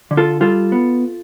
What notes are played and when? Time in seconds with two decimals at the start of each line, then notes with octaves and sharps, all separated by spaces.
0.11 D3
0.17 F4 A4
0.41 G3 F4 A4
0.72 B3